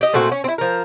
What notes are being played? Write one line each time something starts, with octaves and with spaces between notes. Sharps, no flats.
G4 D#5
A#2 A3 C4 F#4
C#4
C4 E4
F3 A#4